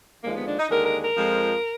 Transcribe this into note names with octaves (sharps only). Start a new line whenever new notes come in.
D#2 D3 F3 G#3 A#3
B3
D4
D#4
D#2 D3 G#3 A#4
A#4
A#4
F2 F3 G#3